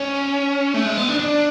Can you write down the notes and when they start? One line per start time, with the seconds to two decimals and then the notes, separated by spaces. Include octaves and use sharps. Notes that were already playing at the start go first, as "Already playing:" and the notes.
Already playing: C#4
0.74 A3
0.86 G#3
0.97 B3
1.09 D4
1.19 D4